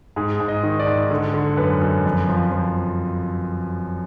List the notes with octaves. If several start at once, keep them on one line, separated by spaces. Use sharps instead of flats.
G#2 G#4
G#2
D#5
D#3
D5
G#2
D3
D3
F#2 B4
F#2
F2
F3
F3